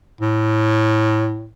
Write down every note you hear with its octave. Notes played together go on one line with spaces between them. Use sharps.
A2